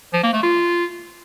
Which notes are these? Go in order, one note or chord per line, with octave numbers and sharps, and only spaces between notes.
F3
A#3
A3
F4